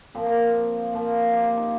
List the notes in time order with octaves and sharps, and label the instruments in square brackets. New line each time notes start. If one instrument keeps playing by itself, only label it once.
[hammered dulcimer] A#2 F3 C4
A#3
C4
A#2 F3
G4
F4
D#4